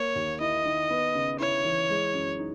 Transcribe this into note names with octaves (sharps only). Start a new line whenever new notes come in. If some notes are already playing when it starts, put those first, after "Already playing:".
Already playing: A#3 C#5
D#2
E4 D#5
D#3
B3
C#3
E4 C#5
E3
G#3
F#2
D#4